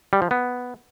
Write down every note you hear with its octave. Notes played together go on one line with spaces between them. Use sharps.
G3
F3
B3